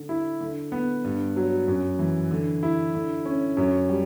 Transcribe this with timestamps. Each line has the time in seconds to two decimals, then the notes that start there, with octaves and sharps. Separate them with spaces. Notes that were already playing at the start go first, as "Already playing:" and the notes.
Already playing: D3
0.09 E4
0.40 D3
0.72 B3
1.04 G2
1.36 F#3
1.68 F#2
1.99 E3
2.31 D3
2.63 E4
2.94 D3
3.25 C#4
3.57 F#2
3.89 G3